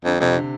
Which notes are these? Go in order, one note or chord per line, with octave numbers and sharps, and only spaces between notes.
F2 D3
F2 C3
D3